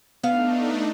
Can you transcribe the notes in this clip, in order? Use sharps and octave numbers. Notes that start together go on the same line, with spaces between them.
A3 B3 D4 D#4 F5